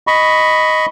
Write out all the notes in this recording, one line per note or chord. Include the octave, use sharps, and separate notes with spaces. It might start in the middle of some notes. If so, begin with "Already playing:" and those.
D#5 B5 C#6